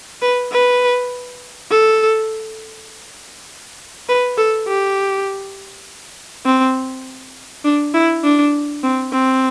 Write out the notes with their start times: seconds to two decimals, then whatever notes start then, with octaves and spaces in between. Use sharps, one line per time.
0.22 B4
0.52 B4
1.70 A4
4.09 B4
4.37 A4
4.68 G4
6.45 C4
7.64 D4
7.94 E4
8.23 D4
8.83 C4
9.12 C4